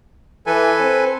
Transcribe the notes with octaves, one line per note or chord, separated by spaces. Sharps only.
E3 A4 B4 G#5
C4